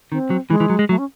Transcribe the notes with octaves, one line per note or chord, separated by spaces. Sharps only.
D#3 C4
F#3
E3 G#3
E3
F#3
G#3
F#3 A3
C#4